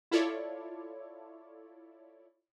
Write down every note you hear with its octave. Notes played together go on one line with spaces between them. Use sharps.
E4 F4 A4 C#5 D5